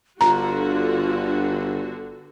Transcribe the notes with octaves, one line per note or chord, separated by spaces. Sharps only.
G1 D3 F4 F#4 A#5